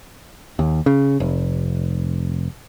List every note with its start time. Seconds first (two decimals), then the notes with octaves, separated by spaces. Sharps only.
0.59 D#2
0.86 C#3
1.20 F1